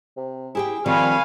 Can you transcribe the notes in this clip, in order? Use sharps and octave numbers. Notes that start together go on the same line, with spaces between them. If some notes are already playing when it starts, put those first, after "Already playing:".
C3
E4 G4 G#4 G5
D#3 F3 G3 C4 C#5 F5 G#5 B5